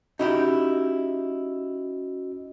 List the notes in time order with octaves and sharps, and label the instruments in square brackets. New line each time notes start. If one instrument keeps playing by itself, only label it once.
[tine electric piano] C#4 F#4 D#5 [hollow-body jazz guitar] D#4 E4 G4